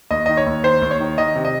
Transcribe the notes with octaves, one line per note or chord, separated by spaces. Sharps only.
D#2 D#5
D#3 D#5
C#5
D#2
D#3 C5
D#2
C#5
D#3
D#3 D#5
C3
D#5